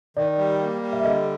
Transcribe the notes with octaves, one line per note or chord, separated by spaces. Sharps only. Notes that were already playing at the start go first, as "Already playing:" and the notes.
D#3 D5
G3
A#3
G3
E5
D3 D#5